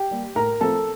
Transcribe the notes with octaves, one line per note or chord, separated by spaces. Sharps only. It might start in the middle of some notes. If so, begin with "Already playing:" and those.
Already playing: G4 G5
G3 A#3
A2 A#4 A#5
F3 A3 C4 A4 A5